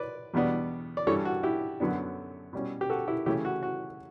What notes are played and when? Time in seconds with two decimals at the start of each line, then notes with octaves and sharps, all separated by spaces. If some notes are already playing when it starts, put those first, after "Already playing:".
Already playing: B4 D5
0.34 E2 B2 G3 B3 D4
0.97 D5
1.07 G2 E3 G3 A4 C#5
1.25 F#4
1.43 E4 G4
1.80 F#2 D3 F#3 B3 D4
2.53 B2 G3 C#4
2.81 G4
2.90 F#4 A4
3.08 E4 G4
3.26 C#3 E3 A3 C#4 E4 G4
3.45 F#4
3.63 F#4